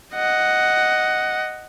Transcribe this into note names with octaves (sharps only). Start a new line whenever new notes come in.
D#5 F#5